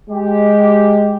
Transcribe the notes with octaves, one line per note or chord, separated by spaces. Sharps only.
G#3 G4